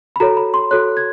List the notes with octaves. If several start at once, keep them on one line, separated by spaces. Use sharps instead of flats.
B5
F#4 A4 C#5 A#5
B5
C6
F#4 A4 C#5 F#6
G#6